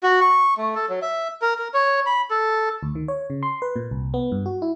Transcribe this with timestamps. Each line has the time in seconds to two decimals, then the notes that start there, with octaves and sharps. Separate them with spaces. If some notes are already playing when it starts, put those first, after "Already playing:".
0.03 F#4
0.21 C#6
0.57 A3
0.75 A4
0.89 F#3
1.02 E5
1.42 A#4
1.59 A#4
1.74 C#5
2.06 B5
2.30 A4
2.83 D2
2.95 D#3
3.08 C#5
3.30 C#3
3.43 C6
3.62 B4
3.76 A#2
3.91 C2
4.14 B3
4.32 G2
4.46 F#4
4.62 E4